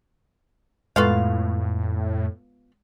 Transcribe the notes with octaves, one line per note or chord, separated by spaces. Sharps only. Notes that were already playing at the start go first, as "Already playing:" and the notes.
F2 A2 G#3 B3 F4 A4 F5 C#6